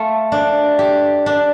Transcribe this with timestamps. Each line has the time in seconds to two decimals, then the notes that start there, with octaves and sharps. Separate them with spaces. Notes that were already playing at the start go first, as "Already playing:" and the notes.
Already playing: A3 F4
0.32 D4
0.79 G4
1.26 D4